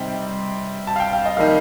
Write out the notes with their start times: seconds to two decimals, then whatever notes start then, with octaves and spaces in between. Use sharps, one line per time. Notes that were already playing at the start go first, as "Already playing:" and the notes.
Already playing: C3 G3 C4 D#4 G5 C6
0.87 A5
0.96 F5
1.00 G5
1.13 F5
1.26 D#5
1.37 D#3 G3 A#3 D#4 F5